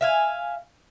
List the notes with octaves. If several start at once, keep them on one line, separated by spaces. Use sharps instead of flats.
E5 F5 G#5